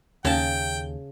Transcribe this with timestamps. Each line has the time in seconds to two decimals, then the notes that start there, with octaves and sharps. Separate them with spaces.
0.25 D#2 C#3 G5 A5